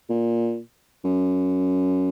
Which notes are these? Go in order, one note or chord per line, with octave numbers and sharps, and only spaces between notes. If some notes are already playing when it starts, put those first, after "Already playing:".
A#2
F#2